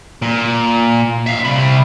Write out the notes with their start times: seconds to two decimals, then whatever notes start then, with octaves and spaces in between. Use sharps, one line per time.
0.22 A#2
1.26 E5 F5
1.44 C3 B5